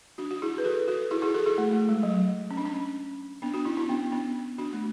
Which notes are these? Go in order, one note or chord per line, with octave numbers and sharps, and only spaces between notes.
D4 F#4
F#4
E4 G#4
B4
F#4 A4
F#4 A4
E4 G#4
E4 G#4
F#4 A4
E4 G#4
A3
A3
G#3
F#3
C#4
D4
C#4
B3 D4
D4 F#4
C#4 E4
C#4 E4
B3 D4
B3 D4
D4 F#4
A3